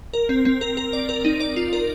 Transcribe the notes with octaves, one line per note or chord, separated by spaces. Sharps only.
A#4
C4
C4
A#4
A#4
D5
A#4
D#4
D5
F4
A#4